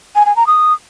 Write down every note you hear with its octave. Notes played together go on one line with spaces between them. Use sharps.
G#5
G#5
A#5
D#6